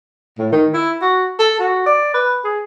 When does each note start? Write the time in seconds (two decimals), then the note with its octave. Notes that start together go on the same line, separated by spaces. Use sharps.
0.39 A2
0.52 D#3
0.74 E4
1.02 F#4
1.39 A4
1.59 F#4
1.86 D5
2.14 B4
2.44 G#4